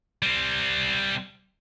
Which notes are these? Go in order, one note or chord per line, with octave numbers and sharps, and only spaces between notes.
G3 C4